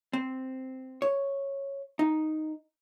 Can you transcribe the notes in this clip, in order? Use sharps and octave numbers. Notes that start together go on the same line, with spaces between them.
C4
C#5
D#4